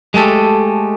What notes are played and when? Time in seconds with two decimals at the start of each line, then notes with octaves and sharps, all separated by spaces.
0.14 G#3 A3 G4 A4